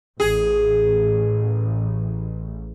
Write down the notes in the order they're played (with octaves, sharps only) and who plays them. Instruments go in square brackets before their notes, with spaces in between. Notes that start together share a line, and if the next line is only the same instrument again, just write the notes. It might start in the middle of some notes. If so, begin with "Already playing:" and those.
[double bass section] A1 [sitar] G#4